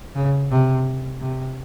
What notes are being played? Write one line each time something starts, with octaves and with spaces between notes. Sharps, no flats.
C#3
C3
C3